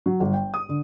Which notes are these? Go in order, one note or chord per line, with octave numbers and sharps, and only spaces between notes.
F#3
G1
G5
D#6
D3